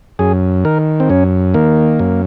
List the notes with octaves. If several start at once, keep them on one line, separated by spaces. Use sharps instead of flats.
F#2 G#4
D#3 A#4
C4
F#2 C#4
D#3 A#3
F#2